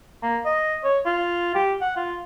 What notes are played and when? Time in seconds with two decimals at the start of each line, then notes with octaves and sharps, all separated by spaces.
0.23 A#3
0.45 D#5
0.84 C#5
1.06 F4
1.55 G4
1.81 F#5
1.97 F4